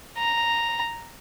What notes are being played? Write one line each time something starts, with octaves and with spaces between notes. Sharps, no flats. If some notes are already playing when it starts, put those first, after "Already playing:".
A#5